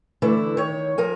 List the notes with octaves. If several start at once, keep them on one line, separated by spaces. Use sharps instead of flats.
D3 E3 A3 E4 B4
D#3 C#5
F3 A#4 G#5